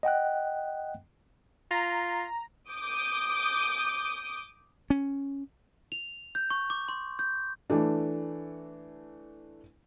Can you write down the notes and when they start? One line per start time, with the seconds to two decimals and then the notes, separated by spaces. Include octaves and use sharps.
0.03 D#5 F#5 G5 F#6
1.71 F4 A#5
2.71 D6 D#6 G6
4.90 C#4
5.92 F7
6.35 G6
6.50 C#6
6.70 D6
6.89 C6
7.19 G6
7.70 E3 A3 D4